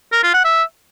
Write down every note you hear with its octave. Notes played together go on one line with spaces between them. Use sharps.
A#4
F4
F#5
E5